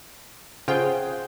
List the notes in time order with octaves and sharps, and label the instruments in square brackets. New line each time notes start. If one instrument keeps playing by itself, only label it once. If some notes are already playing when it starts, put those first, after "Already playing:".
[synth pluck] C#3 F4 G5 [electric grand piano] G#4 C5 F#5